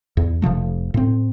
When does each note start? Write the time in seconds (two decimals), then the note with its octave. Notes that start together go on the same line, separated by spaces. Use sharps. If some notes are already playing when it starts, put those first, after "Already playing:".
0.17 E2
0.42 F1 C3 F3 A3
0.94 A2 C4